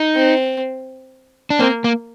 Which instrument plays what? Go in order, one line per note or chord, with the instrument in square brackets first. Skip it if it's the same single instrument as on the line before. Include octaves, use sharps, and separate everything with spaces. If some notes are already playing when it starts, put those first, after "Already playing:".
Already playing: [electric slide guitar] D#4
[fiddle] C4
[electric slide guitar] D4
[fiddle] A#3 [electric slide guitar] C4
[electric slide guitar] A#3